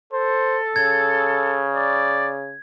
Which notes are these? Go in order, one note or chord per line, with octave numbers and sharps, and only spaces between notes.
A4 C5
C#3 G#6
D5